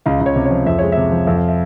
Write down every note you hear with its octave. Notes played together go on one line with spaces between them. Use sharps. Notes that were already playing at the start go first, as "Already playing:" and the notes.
C#2 F5
C#2
C#5
C3
C#5
F3
F2 E5
G#3 C#5
C3 E5
F3
F2 E5
F5
E5